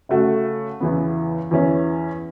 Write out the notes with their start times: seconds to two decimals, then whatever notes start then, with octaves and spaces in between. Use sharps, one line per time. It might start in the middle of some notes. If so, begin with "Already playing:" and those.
0.09 C#3 A3 F#4
0.80 E2 C#3 E3 B3
1.51 E2 E3 C#4 E4